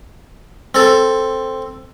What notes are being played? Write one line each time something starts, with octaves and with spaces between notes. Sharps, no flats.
C4 A4